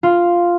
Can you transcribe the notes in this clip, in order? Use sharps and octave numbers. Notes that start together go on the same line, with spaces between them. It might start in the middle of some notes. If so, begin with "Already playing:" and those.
F4